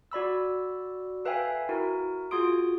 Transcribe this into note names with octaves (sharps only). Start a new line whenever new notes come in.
F#4 D5 B5 E6
A4 B4 E5 F5 G5 G#5
E4 F#4 A#4
F4 F#4 G#4 C6 D#6 D7